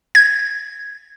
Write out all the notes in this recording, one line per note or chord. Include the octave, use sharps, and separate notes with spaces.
G#6